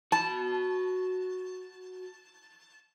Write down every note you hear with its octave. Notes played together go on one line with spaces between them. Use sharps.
F#4 A5 B5